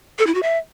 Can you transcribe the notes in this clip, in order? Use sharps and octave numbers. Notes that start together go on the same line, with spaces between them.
A4
E4
F#4
E5